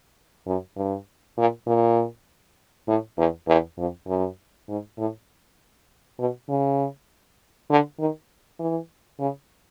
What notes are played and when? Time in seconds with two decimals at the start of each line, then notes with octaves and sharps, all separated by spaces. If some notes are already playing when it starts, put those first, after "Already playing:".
0.46 F#2
0.77 G2
1.38 A#2
1.67 A#2
2.87 A2
3.17 E2
3.48 E2
3.78 F2
4.08 F#2
4.69 G#2
4.99 A2
6.19 B2
6.49 C#3
7.70 D3
7.99 D#3
8.59 E3
9.20 C#3